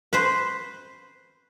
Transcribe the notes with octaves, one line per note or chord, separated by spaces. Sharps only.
B4 C5